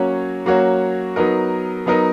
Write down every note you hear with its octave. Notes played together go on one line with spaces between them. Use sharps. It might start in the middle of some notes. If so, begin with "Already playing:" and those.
Already playing: F#3 A#3 C#4 F#4 C#5
F#3 A#3 C#4 F#4 C#5
F#3 B3 D#4 A#4
F#3 B3 D#4 A#4